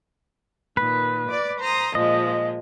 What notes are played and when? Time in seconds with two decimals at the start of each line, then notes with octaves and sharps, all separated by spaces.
0.77 A#2 D#3 B4
1.30 D5 D6
1.59 C5 A#5 D#6
1.95 A#2 F3 G#3 D#5